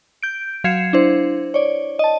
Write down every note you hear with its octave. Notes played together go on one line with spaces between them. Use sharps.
G6 D7
F#3 F5 G#6 C7 C#7 E7
D4 E4 C5
C#5 D5
D#5 A5